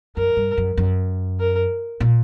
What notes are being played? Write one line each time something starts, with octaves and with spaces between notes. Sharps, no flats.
F#2 A#4
G2
F#2
F#2
A#4
A#2